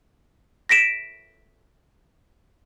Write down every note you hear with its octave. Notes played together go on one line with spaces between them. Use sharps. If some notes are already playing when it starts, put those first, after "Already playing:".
A#6 B6 D7 E7